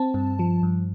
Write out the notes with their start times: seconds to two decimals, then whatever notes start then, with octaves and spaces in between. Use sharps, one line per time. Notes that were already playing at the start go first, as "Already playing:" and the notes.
Already playing: C4 A5
0.14 G2
0.39 F3
0.63 G2